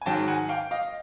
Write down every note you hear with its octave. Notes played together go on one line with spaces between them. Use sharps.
G#5
G#2 D#3 F#3 G5 A5
F#5 G#5
F5 G5
D#5 F5